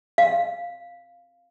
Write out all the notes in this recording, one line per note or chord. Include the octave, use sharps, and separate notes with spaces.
F5